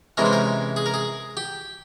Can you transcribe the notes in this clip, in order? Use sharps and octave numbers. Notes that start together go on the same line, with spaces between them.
C3 E3 G#3 C#4 A#4
C5
A#4
G#4
A#4
G#4
G4